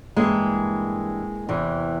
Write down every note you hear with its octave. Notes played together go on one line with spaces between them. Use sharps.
G2 E3 G#3 A#3
E2 C3 E3